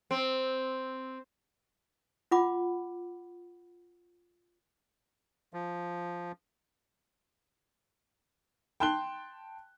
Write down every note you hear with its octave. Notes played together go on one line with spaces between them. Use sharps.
C4
F4 F#5 B5 D6
F3
G5 A5 C6 F#6 G7